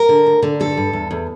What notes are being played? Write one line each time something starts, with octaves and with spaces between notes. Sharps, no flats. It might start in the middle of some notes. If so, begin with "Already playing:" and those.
Already playing: A#4
D3
D2
D3
G2 A4
G2
E2
E2